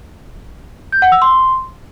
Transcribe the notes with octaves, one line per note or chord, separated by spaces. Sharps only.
G6
F#5
E6
C6